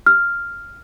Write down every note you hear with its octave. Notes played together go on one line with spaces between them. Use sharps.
F6